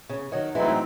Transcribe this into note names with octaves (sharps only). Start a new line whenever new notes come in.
C#3
D#3 F#3
A2 E3 F#3 G#3 C4 D#4